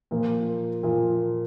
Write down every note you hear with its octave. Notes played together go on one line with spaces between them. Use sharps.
A#2 F3 A#3
A#2 F3 A#3